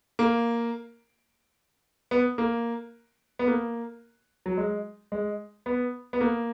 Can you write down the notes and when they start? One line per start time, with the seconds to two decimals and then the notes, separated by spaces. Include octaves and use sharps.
0.19 A#3
2.11 B3
2.38 A#3
3.39 B3
3.47 A#3
4.46 F#3
4.57 G#3
5.12 G#3
5.66 B3
6.13 B3
6.21 A#3